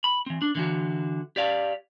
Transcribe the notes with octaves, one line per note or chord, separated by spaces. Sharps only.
B5
E3 C4
D4
D3 E3 F#4
G4 D5 F5